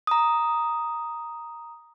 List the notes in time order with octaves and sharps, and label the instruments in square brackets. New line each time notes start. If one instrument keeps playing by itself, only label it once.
[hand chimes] A#5 D#6